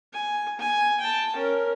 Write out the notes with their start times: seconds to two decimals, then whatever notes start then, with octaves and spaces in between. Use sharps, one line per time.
0.13 G#5
0.59 G#5
1.00 G5 A5
1.36 C#4 A#4